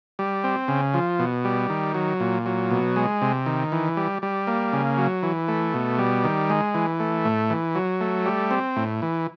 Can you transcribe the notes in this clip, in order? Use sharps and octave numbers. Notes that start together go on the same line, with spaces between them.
G3
C4
C#3
F3
B2
G3
D#3
F#3
A#2
F#3
B2
G#3
C3
D#3
E3
G3
G3
A#3
C#3
F#3
E3
A3
B2
G3
D#3
G#3
E3
A3
A2
E3
F#3
A3
G3
C4
A2
E3